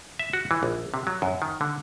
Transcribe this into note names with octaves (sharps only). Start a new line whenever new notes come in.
E5
F#4
E3
A#1
C3
F#3
F#2
D#3
D3